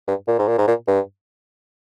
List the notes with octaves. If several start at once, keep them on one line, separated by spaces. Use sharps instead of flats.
G2
A#2
G#2
A#2
G#2
A#2
G2